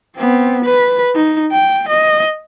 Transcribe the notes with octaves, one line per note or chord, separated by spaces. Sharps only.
B3 C4
B4
D#4
G5
D#5